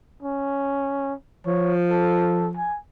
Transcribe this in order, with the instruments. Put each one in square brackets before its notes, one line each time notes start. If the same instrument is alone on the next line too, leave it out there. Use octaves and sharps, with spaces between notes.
[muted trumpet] C#4
[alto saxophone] F3 [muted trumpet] C#5
[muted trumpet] A4
G#5